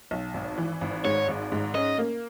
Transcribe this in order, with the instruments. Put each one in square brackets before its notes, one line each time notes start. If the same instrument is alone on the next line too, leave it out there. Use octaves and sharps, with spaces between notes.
[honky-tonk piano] B1
G#1
E3
G#1
[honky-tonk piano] G#2 [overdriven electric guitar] C#5
[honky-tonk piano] G#1
G#2
[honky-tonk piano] C#4 [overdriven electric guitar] D#5
[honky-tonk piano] A#3